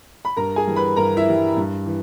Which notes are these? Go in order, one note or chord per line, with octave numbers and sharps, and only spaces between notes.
B5
G2 A#4 A#5
G#4 G#5
E3 G3
B4 B5
G2 A#4 A#5
E4 E5
E3 G3
G2
E3